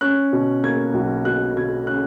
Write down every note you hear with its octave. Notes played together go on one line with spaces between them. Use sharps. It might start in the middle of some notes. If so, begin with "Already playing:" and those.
C#4 F#6
B2
A#3 G#6
B1
B2 F#6
B2 G#6
C#4 F#6